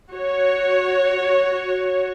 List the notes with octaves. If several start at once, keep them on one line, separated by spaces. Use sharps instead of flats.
F#4 C#5